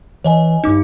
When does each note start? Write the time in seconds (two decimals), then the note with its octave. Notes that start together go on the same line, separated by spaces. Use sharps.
0.24 E3 C#5 D#5 G#5
0.64 G1 G2 D#4 D6